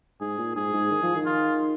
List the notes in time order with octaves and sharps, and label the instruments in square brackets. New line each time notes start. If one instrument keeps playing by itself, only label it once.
[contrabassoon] G#2 [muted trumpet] G#4
[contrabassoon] A#2
[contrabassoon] G#2 [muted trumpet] G#4
[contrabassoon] G#2
D#3
F3
D#3
[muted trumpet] F4